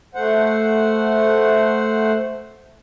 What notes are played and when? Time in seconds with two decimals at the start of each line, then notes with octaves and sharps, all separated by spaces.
0.15 A3 C5 F#5